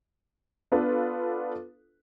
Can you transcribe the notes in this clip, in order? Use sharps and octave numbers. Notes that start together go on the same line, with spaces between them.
B3 D4 F4 A4 B4